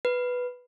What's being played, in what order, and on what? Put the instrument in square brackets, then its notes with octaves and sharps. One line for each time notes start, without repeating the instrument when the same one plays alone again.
[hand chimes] B4